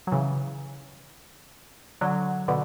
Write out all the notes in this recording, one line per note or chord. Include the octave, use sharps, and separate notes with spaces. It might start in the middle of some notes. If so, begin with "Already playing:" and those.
F#3
C#3 E3
D3 F#3
B2 D3